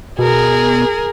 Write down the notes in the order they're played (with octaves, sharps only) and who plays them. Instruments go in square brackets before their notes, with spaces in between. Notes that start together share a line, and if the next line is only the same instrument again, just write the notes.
[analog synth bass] B2 [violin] G#4 A#4